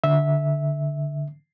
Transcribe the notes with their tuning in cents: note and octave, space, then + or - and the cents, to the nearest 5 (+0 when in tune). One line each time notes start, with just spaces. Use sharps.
D3 +0 E5 -10